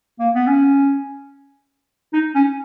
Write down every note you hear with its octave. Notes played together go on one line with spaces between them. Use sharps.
A#3
B3
C#4
D#4
C#4